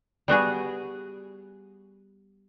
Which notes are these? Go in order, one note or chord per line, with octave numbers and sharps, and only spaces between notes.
G3 B3 F#4 G#4